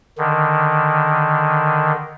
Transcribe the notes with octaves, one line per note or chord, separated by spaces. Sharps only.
D3 D#3